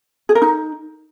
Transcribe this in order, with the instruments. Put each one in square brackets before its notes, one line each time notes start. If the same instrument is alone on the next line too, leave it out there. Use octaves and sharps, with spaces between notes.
[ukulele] G#4
A#4
D#4